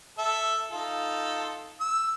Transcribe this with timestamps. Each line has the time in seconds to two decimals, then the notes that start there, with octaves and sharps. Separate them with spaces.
0.18 A4 E5
0.71 D#4 F4 A4
1.81 E6